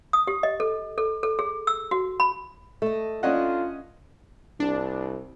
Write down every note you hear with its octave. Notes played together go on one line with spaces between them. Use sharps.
D#6
G4
D#5
A4
A4
A4
G#4
E6
F#4
B5
A3 A4 D#5
C#4 D4 F4 A4 D#5 F#5
C2 D4